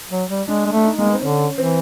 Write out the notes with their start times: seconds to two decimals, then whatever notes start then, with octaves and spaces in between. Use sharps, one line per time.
0.11 F#3
0.30 G3
0.48 G#3 D4
0.66 G#3
0.72 A3 D4
0.85 D#4
0.97 G#3 A#3
1.06 B3
1.13 C4
1.21 D3 C#4
1.58 E3 C4